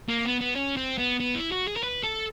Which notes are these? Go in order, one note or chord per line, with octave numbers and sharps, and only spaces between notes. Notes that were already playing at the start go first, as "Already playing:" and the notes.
A#3
B3
B3
C#4
C4
B3
B3
E4
F#4
G#4
A#4
B4
A4